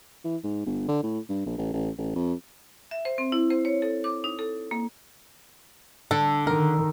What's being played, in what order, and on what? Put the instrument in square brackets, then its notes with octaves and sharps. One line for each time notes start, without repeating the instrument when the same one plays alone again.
[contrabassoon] E3
G#2
G1
D3
A2
G2
A#1
A1
A1
A1
F2
[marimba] E5
C5
C4
E4
C5
C#5
A4
D6
D#4
A4
A#3
[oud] D3 [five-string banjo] A4
[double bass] D#3 [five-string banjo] A#4